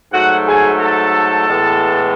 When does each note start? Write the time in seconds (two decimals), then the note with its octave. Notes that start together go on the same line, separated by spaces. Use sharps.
0.12 G#2 F#3 A3 F#4 F#5
0.47 G#4 G#5
0.80 A4 A5
1.48 A2 E3 G#3 B3